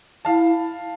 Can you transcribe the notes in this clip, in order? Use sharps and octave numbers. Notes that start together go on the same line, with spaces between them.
E4 F5 A5